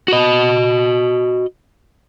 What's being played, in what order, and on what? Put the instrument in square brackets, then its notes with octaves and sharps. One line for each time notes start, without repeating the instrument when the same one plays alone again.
[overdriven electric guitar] F#4 D#5